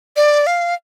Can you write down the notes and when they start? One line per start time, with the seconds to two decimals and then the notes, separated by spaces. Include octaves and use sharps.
0.16 D5
0.47 F5